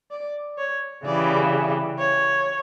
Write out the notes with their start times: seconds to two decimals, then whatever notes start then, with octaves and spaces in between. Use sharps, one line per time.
0.11 D5
0.58 C#5
1.06 C#3 E3 G3 D5
1.99 C#5